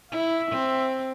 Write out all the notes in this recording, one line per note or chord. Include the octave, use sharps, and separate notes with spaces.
E4 E5
C4